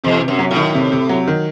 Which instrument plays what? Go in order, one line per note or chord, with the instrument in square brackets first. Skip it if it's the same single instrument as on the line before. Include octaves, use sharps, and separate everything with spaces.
[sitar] E2 [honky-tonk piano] C3
[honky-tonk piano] C3
[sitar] F#2
[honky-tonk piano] F#3
[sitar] A2
[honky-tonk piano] D#3
C3
C3
F#3
D#3